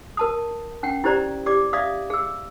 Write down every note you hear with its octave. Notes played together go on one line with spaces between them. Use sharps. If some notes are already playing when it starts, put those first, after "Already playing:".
A#4 A5 D#6
C#4 F#5 G5
E4 G4 C5 D5 A#5
G4 D5 D6
D5 E5 F5 D#6
G#4 E6